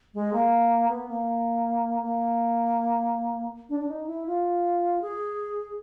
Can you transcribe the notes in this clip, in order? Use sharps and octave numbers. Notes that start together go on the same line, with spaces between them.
G#3
A#3
B3
A#3
A#3
D4
D4
D#4
E4
F4
G#4